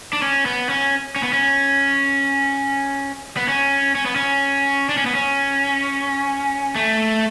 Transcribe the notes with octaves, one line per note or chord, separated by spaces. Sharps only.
D4
C#4
B3
C#4
C#4
B3
C#4
B3
C#4
C#4
B3
C#4
D4
C#4
B3
C#4
A3